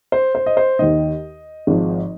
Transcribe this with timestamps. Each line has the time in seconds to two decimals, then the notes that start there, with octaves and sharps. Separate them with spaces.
0.12 C5
0.35 C5
0.46 D#5
0.57 C5
0.79 D#2 D#3 D#5
1.67 G#1 G#2 F3